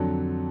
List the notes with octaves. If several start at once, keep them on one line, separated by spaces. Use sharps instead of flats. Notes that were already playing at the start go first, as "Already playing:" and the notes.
Already playing: F2 D3 F#3